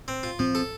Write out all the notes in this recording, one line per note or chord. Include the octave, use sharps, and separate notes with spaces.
C4
F4
F3 C4
A4